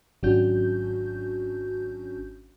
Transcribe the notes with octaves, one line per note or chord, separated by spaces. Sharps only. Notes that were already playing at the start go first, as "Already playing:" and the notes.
G#1 F#3 C#4 D4 F#4 G6